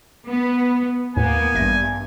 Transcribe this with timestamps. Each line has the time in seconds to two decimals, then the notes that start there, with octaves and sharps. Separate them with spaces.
0.26 B3
1.16 D#2 A2 A#3 B3 G#5
1.55 A1 G2 E5 A#6